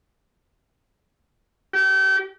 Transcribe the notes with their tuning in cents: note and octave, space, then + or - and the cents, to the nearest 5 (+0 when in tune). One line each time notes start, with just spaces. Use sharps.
G4 -35